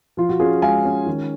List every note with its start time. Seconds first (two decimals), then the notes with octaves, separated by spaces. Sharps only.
0.17 F3 F4
0.29 F#4
0.40 C#4 F4 G#4
0.62 G#3 F5 G#5
0.85 C#4
1.06 D#3